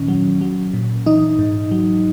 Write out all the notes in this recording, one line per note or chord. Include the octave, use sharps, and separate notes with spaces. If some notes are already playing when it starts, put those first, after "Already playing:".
Already playing: A#2 D#3 C#4
F#3
F#3
A#2
E3 D#4
G#2
F#3